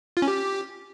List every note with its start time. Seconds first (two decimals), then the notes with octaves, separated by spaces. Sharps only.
0.17 F4
0.22 C#4
0.28 G4